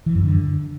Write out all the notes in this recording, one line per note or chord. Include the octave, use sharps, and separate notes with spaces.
E3
F#2
D3